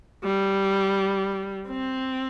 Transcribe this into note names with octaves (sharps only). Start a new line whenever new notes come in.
G3
C4